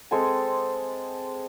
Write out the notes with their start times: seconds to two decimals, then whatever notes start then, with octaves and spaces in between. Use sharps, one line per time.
0.11 G#3 C4 A4 G#5